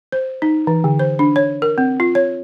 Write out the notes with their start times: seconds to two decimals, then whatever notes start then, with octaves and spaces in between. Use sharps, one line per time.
0.12 C5
0.42 D#4
0.67 E3
0.84 D3
0.99 C5
1.19 D4
1.36 C#5
1.62 A#4
1.78 C4
2.00 F4
2.15 C#5